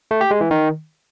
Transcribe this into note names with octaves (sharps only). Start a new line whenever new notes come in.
A3
G4
G#3
E3
D#3